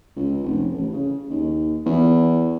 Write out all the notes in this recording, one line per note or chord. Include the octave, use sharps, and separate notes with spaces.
C#2
F1
A1
C#3
D#2
E2